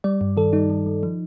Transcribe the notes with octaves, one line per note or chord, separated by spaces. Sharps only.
G3 D5
G2
D#3 A4
G3 D#4
D#3
D#3
F3